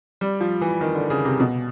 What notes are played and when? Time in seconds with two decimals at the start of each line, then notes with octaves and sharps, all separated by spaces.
0.21 G3
0.40 F3
0.61 E3
0.81 D#3
0.95 D3
1.10 C#3
1.25 C3
1.40 B2